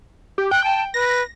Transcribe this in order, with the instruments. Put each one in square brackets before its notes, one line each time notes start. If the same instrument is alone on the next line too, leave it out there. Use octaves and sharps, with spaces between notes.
[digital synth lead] G4
[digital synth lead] G5 [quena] F#6
[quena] A5
[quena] B4 [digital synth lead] A#6